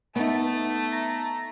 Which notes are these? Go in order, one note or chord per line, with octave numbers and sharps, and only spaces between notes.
A3 B3 D#4
A#5